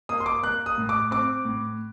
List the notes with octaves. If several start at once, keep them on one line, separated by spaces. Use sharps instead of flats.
A#3 D#6
C6
D6
A#3 F#6
D#6
A2
D6
C4 D6
A2